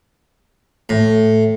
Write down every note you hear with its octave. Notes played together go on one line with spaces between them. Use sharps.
A2